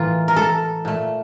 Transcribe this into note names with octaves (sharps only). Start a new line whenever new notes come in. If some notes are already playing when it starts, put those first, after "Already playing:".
Already playing: A2 E3 A#3 F4
A#4
A4
A#2 A3